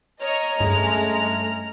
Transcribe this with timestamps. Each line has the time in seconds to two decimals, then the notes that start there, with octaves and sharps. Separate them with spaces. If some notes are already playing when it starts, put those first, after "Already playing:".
0.21 C#5 D#5 A#5 F6
0.60 G2 G#3 A3 C#4